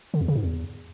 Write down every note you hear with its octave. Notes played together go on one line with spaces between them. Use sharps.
D3
E2
C#3
G#2
E2